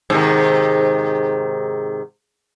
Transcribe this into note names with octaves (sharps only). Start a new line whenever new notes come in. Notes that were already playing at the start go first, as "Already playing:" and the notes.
G#2 C3 D#3